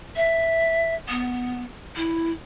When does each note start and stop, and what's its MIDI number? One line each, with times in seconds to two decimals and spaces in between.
0.17 0.95 76
1.09 1.63 59
1.96 2.31 64